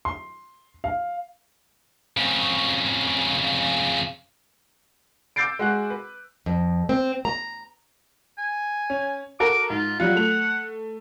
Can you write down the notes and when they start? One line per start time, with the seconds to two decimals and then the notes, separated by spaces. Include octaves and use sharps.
0.05 C6
0.84 F5
2.17 F2 C#3
5.36 D6 E6 G6 A6 C7 D7
5.59 G#3 F#4 F#6
5.90 B4
6.46 F2
6.89 C4
7.25 A#5
8.38 G#5
8.90 C#4
9.40 F#4 A4 A#4 D6
9.70 G#2 F4
10.00 F#3 G3 F4 F#5
10.16 A3 F7